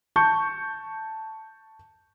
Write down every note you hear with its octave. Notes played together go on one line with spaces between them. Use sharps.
A5 C#6 G6 C#7